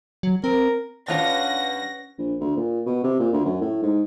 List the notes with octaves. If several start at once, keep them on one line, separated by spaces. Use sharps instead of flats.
F#3
C4 A#4
E2 G2 C#4 D4 F4 C#5 F#5 A#6
A#1
D2
A#2
B2
C3
A#2
D2
F#2
A2
G#2